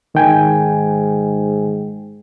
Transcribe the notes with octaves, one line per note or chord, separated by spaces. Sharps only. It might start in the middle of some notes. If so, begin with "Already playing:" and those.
G#2 D#3 G5 G#5